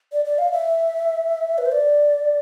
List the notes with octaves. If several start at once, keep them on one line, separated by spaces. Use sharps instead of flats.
D5
D5
F5
E5
B4
C5
D5